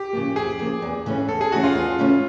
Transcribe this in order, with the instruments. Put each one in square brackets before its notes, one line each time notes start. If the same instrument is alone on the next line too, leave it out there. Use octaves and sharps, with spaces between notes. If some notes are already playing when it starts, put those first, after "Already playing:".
Already playing: [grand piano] G4
[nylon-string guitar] C#3 F3 A#3
[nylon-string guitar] F2 [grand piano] G#4
[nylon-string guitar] C#3 F3 A#3
E2
C#3 E3 A3 C#4
[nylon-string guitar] E2 [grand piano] A4
[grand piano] G#4
[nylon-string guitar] C#3 E3 A3 C#4 [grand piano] F#4
[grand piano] F4
[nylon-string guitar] E2
C#3 E3 A3 C#4